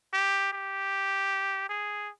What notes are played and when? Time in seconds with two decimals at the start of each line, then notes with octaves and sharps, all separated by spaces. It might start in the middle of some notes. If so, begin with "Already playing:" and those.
0.13 G4
0.52 G4
1.69 G#4